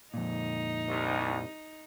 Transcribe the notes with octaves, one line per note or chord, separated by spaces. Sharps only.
F2 A#2 D#4
C2